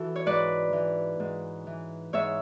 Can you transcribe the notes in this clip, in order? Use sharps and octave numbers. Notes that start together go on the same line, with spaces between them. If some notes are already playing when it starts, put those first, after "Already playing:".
Already playing: E3 F#4 A4
C#5
G#2 B4 D5
E3
G#2
E3
G#2 C#5 E5